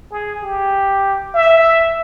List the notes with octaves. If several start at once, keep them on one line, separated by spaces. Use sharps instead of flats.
G#4
G4
E5